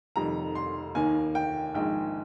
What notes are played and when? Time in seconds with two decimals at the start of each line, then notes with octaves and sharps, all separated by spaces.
0.16 F1 F2 D#3 G3 A#5
0.55 C6
0.95 D#2 D#3 A#3 G#5
1.35 G5
1.75 A#1 G#2 D#3 G#3 G5